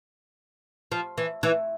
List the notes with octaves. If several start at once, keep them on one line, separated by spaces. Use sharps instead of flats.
F3
E3
E3